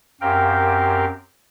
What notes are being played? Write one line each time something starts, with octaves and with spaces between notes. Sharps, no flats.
F#2 C4 G4 A#4 F5 G5